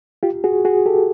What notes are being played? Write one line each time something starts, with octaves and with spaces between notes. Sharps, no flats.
F4 G4
F#4 G#4
F#4 G#4
G4 A4